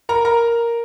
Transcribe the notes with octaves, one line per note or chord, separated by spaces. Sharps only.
A#4 A#5
A#4 A#5